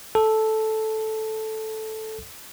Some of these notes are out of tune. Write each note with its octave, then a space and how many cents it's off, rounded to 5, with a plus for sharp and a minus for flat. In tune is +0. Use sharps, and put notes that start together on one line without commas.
A4 -5